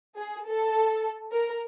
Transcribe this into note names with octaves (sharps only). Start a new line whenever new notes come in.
G#4
A4
A#4